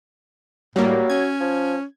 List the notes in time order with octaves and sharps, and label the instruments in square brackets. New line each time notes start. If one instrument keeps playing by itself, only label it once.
[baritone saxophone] A2 [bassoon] F#3 [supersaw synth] G3 A#3
[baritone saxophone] C#4 [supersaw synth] G#6
[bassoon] F3